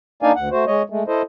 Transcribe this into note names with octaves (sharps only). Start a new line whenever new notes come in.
A#3 D4 D#4 D5 F5 G#5
D2 F#5
A3 F#4 C5
G#3 C#5 D#5
G#3 A3
E4 A4 C5 D#5